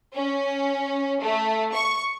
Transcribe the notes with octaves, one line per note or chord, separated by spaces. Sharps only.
C#4
A3
C#6